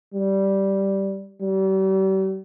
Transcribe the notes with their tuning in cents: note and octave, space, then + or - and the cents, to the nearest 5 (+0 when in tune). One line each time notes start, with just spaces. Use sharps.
G3 -10
G3 -40